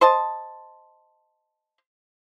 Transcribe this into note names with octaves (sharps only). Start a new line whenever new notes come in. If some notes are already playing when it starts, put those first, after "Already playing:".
C5 D#5 A5